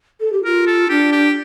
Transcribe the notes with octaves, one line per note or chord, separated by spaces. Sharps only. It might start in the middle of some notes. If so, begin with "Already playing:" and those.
A4
G4
F4 A#4
A4
D4 G4
G4